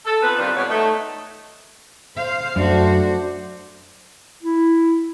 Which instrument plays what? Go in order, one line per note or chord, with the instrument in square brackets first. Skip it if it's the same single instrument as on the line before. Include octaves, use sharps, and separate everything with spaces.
[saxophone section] A4
C4 D#4 F4 B4
C3 D#3 G3 D4 F4
F2 B2 G#3 F#4 B4 C#5
A3 D#4
[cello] C5 F5
[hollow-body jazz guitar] F#2 [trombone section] A3 D4 [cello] F#4 C5
[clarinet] E4